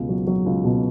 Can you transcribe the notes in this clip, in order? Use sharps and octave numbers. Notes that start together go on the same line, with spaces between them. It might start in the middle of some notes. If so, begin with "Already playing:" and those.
Already playing: C#2 B2
F#3
F#3
C#2
B2